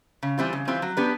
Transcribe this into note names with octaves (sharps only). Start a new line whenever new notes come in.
C#3
E3 G3 C4 F4
C#3
E3 G3 C4 F4
F#3
B3 D4 G4 B4